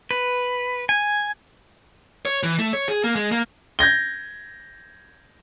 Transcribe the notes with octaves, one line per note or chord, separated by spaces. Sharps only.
B4
G#5
C#5
E3
A3
C#5
G#4
A#3
G#3
A#3
G6 G#6 A#6 G7